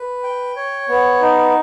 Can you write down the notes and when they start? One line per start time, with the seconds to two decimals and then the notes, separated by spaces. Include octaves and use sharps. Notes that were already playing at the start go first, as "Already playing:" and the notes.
Already playing: B4
0.23 G5
0.56 C#5
0.89 B3
1.21 D#4